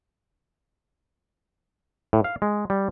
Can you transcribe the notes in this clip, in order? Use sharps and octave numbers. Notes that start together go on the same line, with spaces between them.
A2
F5
G#3
G3